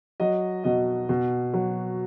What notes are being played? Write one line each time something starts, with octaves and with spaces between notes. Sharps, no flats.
F#3 D#5
B2 D#5
B2
F#3